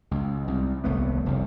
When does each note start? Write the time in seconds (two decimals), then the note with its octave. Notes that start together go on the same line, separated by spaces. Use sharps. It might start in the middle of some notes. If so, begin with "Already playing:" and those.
0.11 C#2
0.48 C2
0.84 D#1 C2 A3 B3
1.26 F1 C2